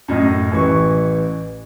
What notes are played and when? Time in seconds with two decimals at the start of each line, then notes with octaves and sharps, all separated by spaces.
0.08 F#2 A2 D#5
0.51 A1 E3 C#6